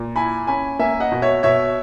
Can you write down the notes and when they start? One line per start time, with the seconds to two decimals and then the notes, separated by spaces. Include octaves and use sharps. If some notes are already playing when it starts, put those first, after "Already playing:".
Already playing: A#2
0.16 E4 G#5 B5
0.47 C#4 G#5 B5
0.79 A#3 E5 G#5
1.00 D#5 F#5
1.12 B2
1.22 C#5 E5
1.43 B2 C#5 E5